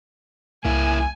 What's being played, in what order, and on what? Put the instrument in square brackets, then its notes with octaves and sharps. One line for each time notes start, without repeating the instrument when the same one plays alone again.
[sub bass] C2 [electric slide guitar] A#3 E4 [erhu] G#5